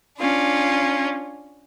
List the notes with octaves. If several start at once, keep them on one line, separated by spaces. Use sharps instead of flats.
C#4 D4 F4